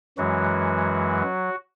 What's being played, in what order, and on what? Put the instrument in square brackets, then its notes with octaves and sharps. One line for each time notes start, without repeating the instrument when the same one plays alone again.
[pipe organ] F#2 E3 F#3 G#3 F#4